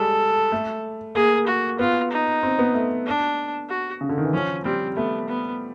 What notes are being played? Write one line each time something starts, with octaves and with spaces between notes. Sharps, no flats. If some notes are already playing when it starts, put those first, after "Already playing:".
Already playing: G3 G#3 A4
A3
A#3 G#4
F#4
B3 F4
D#4
C4
B3
A3
D4
F#4
C#3
D3
D#3
E3
F3 C#4
G3 C4
A3 B3
B3